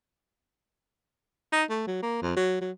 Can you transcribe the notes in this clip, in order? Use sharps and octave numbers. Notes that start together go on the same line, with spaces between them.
D#4
A3
F#3
A#3
F2
F#3
F#3